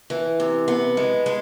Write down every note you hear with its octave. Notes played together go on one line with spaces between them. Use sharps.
E3
C3
B3
G#3
G#3